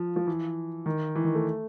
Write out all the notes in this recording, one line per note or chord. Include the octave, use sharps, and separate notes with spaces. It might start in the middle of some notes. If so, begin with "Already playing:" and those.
Already playing: F3
F3
E3
D#3
E3
D#3
A3